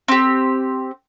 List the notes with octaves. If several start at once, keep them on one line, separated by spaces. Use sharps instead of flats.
C4 G4